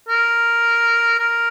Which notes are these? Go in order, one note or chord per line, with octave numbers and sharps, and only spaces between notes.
A#4
A#4